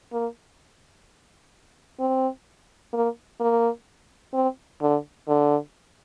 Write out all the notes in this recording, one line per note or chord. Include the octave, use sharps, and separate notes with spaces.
A#3
C4
A#3
A#3
C4
D3
D3